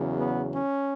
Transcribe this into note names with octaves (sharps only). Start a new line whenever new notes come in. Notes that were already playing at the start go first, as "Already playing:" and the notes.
Already playing: E2 C#3 F#3
B3
C#4